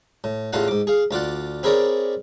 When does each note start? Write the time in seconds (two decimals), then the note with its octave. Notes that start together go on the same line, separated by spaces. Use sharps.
0.24 A2
0.53 A1 E2 A2 F4 F5 F#5
0.68 G#2 D6
0.87 G#4 F5
1.11 D2 F4 D5 F#5
1.63 C4 E4 G#4 A#4 C#5 D5